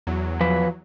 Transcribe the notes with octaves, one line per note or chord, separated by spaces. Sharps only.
E2 F#3
F3 B4